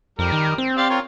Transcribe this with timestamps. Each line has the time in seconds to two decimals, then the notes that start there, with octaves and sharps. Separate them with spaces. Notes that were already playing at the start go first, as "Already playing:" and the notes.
0.19 F2 G3 A#4
0.32 D#3
0.58 C4
0.77 G4 D5 F5
0.90 F4 A#4 C#5